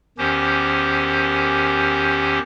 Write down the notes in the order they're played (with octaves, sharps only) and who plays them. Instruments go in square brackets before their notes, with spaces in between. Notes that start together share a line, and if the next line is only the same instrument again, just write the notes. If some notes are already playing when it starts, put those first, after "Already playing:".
[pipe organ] E2 D#3 C#4 G4 C5